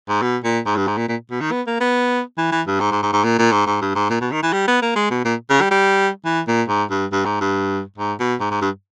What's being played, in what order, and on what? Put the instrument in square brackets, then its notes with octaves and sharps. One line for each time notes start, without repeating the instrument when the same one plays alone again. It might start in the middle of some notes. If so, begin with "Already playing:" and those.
[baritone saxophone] G#2
B2
A#2
G#2
G2
G#2
A#2
A#2
B2
D#3
B3
A#3
B3
E3
E3
G2
G#2
G#2
G#2
G#2
A#2
A#2
G#2
G#2
G2
G#2
A#2
B2
D#3
E3
G3
B3
A#3
G#3
B2
A#2
C#3
G3
G3
E3
A#2
G#2
G2
G2
G#2
G2
G#2
B2
G#2
G#2
G2